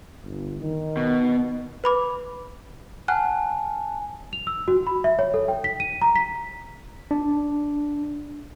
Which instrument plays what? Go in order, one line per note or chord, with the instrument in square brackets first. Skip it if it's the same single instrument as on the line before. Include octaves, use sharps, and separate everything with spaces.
[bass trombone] G1
D#3
[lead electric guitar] B2
[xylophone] B4 B5 D6
[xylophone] F#5 F6 F#6 [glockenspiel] G#5 A5
[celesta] F7
E6
F#4
B5
E5
C#5
A4
G5
B6
D#7
A#5
B6
[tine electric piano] D4